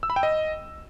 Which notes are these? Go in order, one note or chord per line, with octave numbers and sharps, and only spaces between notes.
E6
B5
G5
D#5